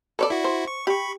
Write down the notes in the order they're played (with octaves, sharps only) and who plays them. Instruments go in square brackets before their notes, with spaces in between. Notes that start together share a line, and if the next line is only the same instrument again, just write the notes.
[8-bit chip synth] A4 [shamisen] B4 C#5 D5
[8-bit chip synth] E4 F#4
[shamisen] C5
[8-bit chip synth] C#6
[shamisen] G4 [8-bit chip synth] B5 C#6